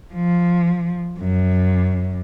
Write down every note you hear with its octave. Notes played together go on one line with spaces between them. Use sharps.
F3
F#2